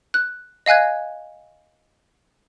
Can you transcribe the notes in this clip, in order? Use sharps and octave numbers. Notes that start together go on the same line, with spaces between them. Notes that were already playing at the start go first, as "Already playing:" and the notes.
F#6
D#5 F5 G#5 F#6 G#6